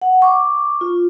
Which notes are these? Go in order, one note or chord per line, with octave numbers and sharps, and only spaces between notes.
F#5
C#6 D6
F4